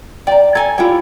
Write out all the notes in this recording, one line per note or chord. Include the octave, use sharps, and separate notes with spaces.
D5 G5 A#5
A4 G#5 A#5
E4 F4 G4 C#5 G5